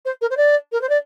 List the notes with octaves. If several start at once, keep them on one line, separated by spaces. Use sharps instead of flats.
C5
A#4
C5
D5
A#4
C5
D5